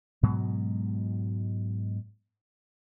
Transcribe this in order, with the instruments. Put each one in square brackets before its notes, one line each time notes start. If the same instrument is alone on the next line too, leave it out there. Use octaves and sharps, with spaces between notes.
[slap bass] G#2 B2 F#3 G#3